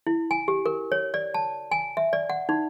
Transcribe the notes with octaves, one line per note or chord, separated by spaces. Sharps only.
E4
G#5
G4
A#4
C#5
D5
A5
G#5
E5
D5
F#5
D#4